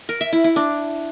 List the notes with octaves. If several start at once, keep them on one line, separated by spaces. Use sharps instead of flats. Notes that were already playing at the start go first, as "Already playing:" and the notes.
A#4
E5
E4
E4
D4